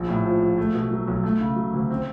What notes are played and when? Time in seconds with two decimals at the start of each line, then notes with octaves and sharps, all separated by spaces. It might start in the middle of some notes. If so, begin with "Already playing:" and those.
Already playing: A#1
0.09 A2
0.25 F3
0.42 A#1
0.58 A3
0.74 B2
0.91 F#3
1.08 B1
1.24 A3
1.41 C#3
1.56 F#3
1.73 D2
1.90 C4